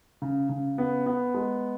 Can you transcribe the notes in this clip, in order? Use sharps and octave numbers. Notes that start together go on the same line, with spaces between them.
C#3
C#3
B3
B3
G#3